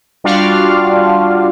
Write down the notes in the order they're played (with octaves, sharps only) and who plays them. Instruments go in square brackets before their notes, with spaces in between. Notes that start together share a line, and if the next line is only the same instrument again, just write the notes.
[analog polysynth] G3 D4 F4 F#4 D5 F5